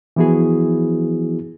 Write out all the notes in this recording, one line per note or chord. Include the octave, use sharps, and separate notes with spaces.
E3 F3 B3 E4 F#4 G#4